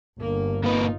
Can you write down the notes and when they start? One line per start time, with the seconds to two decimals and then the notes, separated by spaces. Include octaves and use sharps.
0.19 G1 A#3 A#4
0.64 A#2 D#4 F4 B4